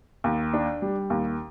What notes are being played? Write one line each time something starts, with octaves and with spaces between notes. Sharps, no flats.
D#2
D4
G3
D#2